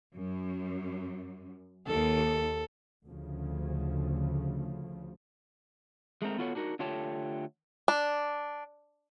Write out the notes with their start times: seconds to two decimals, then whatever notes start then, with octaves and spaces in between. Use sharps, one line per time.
0.16 F#2
1.87 D#2 A4
3.09 D2 C#3 F3
6.22 G#3 A3 C4 A#4
6.38 B3 F4 F#4 A4 C5 C#5
6.55 D4 D#4 F#4 A#4
6.79 D3 A3 F4 G4 C#5 A5
7.88 D4